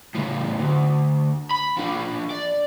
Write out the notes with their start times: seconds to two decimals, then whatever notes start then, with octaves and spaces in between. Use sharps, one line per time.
0.15 A2 C#3
0.60 D2
1.51 B5
1.77 F3 D4
2.31 D5